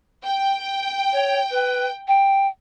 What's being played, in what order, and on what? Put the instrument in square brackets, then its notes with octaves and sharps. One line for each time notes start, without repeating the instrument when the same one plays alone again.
[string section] G5
[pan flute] C#5
B4
G5